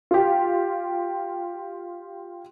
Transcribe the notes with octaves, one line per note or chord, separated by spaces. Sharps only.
F4 G4